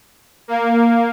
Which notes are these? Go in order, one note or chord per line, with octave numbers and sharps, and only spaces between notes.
A#3